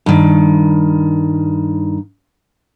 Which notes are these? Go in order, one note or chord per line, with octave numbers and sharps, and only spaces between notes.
G2 D#3